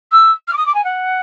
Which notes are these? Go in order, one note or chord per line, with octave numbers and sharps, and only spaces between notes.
E6
F6
D6
D#6
D6
G#5
F#5